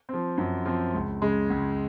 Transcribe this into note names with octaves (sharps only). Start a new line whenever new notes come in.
F3 C4
F#2
F3 C4
C#2
C#3 G#3
C#2